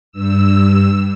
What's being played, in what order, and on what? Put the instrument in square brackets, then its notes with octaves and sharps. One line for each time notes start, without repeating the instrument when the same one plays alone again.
[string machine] G2 E6